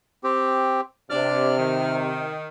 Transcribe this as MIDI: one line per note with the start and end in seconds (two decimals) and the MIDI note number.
0.24 0.81 60
0.24 0.81 67
1.10 2.34 48
1.10 1.58 62
1.10 1.58 74
1.10 1.96 89
1.58 2.48 51